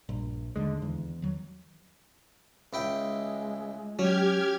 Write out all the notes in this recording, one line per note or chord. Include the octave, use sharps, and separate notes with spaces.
A#1 G2
D#2 D3 G#3
E2
D#3 F#3
C#2 G#3 E4 G5
F#3 C#4 G4 F6 G#6